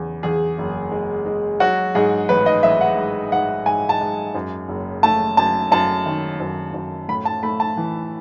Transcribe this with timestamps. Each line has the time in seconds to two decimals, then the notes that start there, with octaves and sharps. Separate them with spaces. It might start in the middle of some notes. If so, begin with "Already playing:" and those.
Already playing: E2 C#3
0.23 E2 G#4
0.58 F#1
0.92 G#3
1.26 G#3
1.60 F#3 F#4
1.95 G#2 G#4
2.29 A1 B4
2.46 D#5
2.63 A1 E5
2.81 F#5
2.97 G#2
3.32 G#2 F#5
3.66 G#2 G#5
3.89 A5
4.01 G#2
4.34 F#2
4.69 F#1
5.03 A3 A5
5.37 F#2 A5
5.72 F#2 A5
6.06 D#3
6.40 F#2
6.74 F#2
7.09 A2 B5
7.25 A5
7.43 A3 B5
7.60 A5
7.77 E3